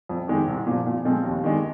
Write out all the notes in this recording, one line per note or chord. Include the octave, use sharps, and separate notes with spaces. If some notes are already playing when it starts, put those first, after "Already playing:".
F2
D#3 G#3 D#4 G4
C2
A#2 F3
A#2
F3 G#3 C4 F4
D#2
D#3 G#3 D4